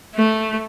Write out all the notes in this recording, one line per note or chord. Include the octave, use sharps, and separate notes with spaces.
A3